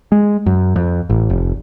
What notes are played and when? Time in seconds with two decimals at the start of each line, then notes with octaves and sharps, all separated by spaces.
0.12 G#3
0.46 F#2
0.76 F2
1.10 A1
1.30 F1